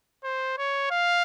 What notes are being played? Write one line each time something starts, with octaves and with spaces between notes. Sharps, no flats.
C5
C#5
F5